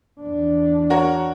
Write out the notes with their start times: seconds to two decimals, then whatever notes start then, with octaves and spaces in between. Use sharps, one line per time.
0.20 E2 D4
0.90 F#4 A#4 C#5